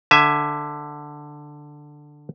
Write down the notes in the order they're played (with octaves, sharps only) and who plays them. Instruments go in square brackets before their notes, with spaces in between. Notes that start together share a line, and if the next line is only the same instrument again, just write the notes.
[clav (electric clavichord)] D3 E5 G#5